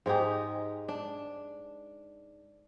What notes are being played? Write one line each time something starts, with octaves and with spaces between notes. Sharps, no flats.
G#2 G#3 D#4 G4
D4